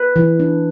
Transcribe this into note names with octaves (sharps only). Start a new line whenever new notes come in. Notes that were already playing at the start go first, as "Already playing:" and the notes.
Already playing: B4
E3
D4